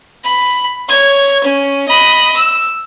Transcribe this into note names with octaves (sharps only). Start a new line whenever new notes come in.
B5
C#5 G#6
C#4
D#5 B5
E6